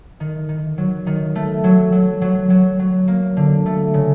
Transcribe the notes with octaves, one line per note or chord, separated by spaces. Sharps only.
D#3
D#3
F#3
D#3
A3
F#3
F#3
F#3
F#3
F#3
A#3
D3
A3
C#3